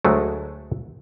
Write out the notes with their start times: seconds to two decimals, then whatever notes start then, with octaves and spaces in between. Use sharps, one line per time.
0.05 D2 F#3 G#3 A3